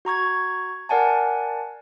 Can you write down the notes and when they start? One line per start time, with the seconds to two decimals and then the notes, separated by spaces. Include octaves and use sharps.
0.05 F#4 A#5 C#6 G#6
0.89 A#4 D5 F#5 G#5 A5